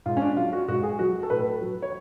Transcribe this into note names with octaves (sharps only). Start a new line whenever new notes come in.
G#2 F4
C#4
D4
F#3 F4
F#4
G#2 F#4
G#4
F#3 F#4
A4
A2 B4
F#3
C#5